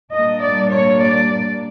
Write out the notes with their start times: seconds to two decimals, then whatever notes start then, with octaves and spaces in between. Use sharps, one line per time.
0.13 A#2 G3 A#3 D4 D#5
0.43 D5
0.73 C#5
1.03 D5